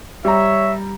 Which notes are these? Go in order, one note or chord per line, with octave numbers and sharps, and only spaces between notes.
G3 C#5 E5 A#5